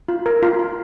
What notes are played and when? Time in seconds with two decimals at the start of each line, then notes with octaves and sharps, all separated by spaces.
0.08 F4
0.26 A#4
0.43 F4
0.59 F4